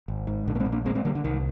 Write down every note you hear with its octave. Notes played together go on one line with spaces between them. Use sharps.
G#1
G#2
A#1 D3
A#3
G#3 C4
A#2
A#3 D4
D2 G#3 C4
G#3 C4
D3 G3 A#3
D3
C2 D#3